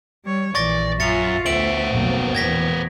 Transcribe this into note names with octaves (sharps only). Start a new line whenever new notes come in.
G3 C#5
A#1 E3 D5 C#6 A6 A#6
F#2 F4 E5 A6 C#7 F7
D2 B3 C5 E5 D7 F#7
F1 B1 B2 A#3
E2 A#2 G#6 A#6 B6